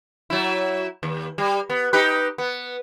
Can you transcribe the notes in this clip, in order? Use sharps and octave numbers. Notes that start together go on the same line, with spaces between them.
F#3 E4
D#2
G3
B3
D#4 G4 B4
B3